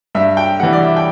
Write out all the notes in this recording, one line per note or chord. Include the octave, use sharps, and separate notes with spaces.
G2 E5
G5
E3 G3 F#5
D5
E5
G5